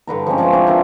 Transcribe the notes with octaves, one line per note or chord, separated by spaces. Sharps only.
G2 D3 B4 A#5
F3 G#3 C4 C#4
F3 D5 E5
C4 D4 C#5 D5
D4 F4 A#4 E5